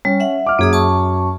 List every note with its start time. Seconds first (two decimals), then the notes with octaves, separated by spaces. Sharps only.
0.05 G3 C#4
0.20 E5 F#5
0.46 D6 F6
0.59 F#2 A#3 G#4 D#6
0.73 A5 C#6